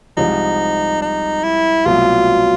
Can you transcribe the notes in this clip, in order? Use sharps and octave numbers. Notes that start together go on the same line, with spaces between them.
C2 C3 F3 G#3 D#4
D#4
E4
C2 B2 F#3 A3 F4